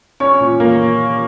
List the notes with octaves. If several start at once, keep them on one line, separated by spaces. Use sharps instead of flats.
C#4 C#5 C#6
A#2
A#3